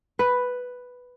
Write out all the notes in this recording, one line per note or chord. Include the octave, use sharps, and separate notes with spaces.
B4